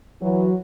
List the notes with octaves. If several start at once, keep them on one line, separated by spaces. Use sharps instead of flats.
E3 F#3